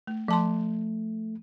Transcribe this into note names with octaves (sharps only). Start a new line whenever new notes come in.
A3
F3 A3 A5 C6